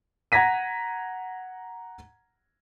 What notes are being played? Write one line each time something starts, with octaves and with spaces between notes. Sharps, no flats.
F#5 A#5 G#6 A#6 B6 D#7